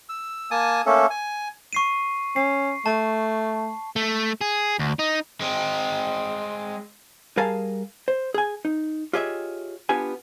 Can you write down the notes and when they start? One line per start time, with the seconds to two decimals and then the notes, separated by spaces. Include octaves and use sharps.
0.09 E6
0.51 A#3 G#5 A5 D#6
0.86 A3 A#3 C#4 A4
1.10 G#5
1.73 C#6 C7 D#7
2.36 C#4 C7
2.86 A3 A5
3.96 A3
4.41 G#4
4.79 D2
4.99 D#4
5.41 G#3 C4
7.37 G3 G#4 A#4 F5 G#5 A5
8.08 C5
8.34 G#4 G#5
8.65 D#4
9.13 F4 G4 G#4 C#5 D#5 E5
9.89 B3 D4 F4 G4 G#5